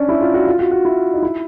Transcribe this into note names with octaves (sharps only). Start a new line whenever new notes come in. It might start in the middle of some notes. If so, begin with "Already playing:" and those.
Already playing: C#4 D4
E4
F4
F#4
F4
F#4
F#4
E4
D#4
E4